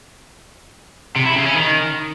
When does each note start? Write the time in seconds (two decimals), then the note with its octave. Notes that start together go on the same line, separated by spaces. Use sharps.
1.16 C3
1.26 E4
1.35 C#3
1.45 C#4
1.55 D#3